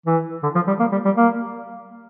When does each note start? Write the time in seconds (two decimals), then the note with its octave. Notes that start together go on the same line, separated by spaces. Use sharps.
0.06 E3
0.43 D3
0.55 F3
0.67 G3
0.80 A#3
0.92 G3
1.05 G3
1.16 A#3